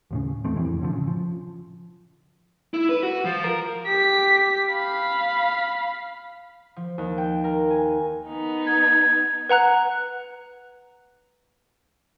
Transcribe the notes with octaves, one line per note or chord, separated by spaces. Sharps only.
D#2 A2 C#3
F1 E2 A3 C4
F2 A2 C3 E3
A2 D3 F3
C#3
F3
E4
B4
F#4
F3
A#4
G4 B6
F5 B5
F3
D#2
G5
A#4
G#5
B3 D#4
G#6
B4 F#5 A#5 F#6